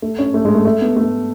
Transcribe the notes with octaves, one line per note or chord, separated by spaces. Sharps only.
A3
C#4
A3
G#3
A3
A3
B3
A3